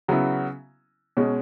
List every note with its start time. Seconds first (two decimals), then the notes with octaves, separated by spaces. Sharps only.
0.08 C#3 F#3 B3 E4
1.17 B2 G#3 C#4